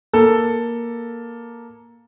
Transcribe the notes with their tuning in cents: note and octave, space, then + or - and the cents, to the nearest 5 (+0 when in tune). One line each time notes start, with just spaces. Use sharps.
A#3 +10 A4 +5